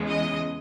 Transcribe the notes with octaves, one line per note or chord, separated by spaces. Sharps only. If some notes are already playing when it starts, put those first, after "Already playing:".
Already playing: E2 C#3 E3 G#3
D#5